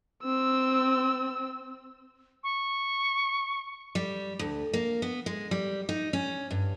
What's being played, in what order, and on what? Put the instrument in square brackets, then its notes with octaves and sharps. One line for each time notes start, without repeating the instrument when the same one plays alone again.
[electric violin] C4 E6
[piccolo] C#6
[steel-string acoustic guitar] G3
D2
A#3
B3
G#3
G3
D#4
C#4
G2